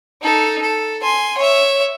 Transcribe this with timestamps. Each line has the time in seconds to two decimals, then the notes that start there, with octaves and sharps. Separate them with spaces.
0.22 D#4 A4
0.62 A4
1.02 G#5 C6
1.38 C#5 E5